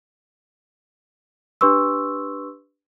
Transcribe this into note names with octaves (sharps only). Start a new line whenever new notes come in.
D4 G4 B4 C6 C#6 E6